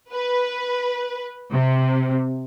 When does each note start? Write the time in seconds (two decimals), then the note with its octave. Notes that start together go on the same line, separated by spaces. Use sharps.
0.13 B4
1.51 C3